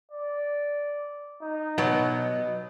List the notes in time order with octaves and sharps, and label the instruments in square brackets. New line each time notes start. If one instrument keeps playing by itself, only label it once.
[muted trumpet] D5
D#4
[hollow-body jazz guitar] B2 F#3 B3
[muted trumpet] D#5